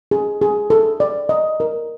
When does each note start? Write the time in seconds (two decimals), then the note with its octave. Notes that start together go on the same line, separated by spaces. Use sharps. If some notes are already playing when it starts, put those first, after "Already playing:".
0.11 G#4
0.41 G#4
0.70 A4
1.00 D5
1.29 D#5
1.60 A#4